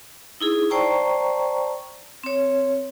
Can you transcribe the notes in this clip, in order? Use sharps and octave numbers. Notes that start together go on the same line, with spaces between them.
D#4 E4 G#4
C5 D5 G5 A5 A#5 C#6
C4 C#5